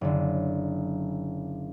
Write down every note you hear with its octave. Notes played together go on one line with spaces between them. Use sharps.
F#1 D3